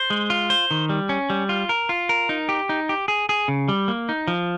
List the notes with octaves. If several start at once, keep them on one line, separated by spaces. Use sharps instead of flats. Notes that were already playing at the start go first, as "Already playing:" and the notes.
Already playing: C5
G#3
F4
C5
D#3
G3
C#4
G3
F4
A#4
F4
A#4
D#4
G4
D#4
G4
G#4
G#4
C#3
G3
A#3
D#4
F3